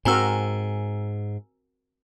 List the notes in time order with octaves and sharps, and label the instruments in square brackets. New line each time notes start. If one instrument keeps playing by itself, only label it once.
[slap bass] G#2 [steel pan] C4 F#4 A#4 [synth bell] G#5 A#5 E6